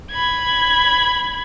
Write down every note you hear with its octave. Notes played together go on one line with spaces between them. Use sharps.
B5 G#6